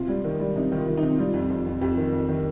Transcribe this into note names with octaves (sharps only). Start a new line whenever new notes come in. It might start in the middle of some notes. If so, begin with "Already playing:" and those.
Already playing: C3 F4
G3
D#3
G3
C3 D#4
D#3
F4
D#3
C3 D#4
G3 F4
F2
F2
F2
F2 G4
D#3
F2
D#3